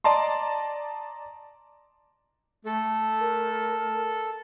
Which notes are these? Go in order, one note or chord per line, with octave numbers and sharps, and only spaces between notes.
D5 D#5 A5 A#5 C6
A3 A4
A#4